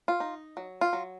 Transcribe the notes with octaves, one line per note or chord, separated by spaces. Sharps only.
F4
D#4
F#3
F4
F#3